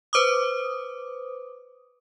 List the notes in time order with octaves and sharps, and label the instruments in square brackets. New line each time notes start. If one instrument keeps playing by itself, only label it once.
[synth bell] B4 C5 D6 D#6